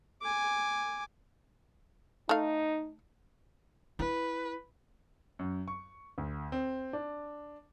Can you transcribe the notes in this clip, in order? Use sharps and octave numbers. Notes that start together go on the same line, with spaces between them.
G#5 D6
A3 D#4 F5
E4 B4
F#2
C#6
D2
C4
D4